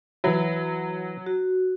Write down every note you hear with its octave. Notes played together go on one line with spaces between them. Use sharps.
E3 F#3 E4
F#4